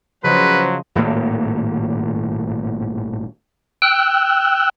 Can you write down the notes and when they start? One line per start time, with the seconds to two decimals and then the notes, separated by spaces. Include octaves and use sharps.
0.24 C#3 F3 F#3 B4 C5 D#5
0.95 D#1 G#1 A2 A#3
3.82 G5 E6 F#6